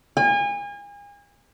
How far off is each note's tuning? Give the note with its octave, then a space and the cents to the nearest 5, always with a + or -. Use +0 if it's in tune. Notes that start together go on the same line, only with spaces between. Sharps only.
G#5 -35